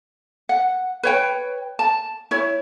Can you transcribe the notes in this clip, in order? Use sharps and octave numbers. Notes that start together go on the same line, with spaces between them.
F#5
B4 C#5 G5
A5
E4 C#5